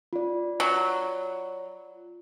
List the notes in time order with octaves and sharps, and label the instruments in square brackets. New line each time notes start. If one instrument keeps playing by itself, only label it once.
[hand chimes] F4 D5
[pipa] F#3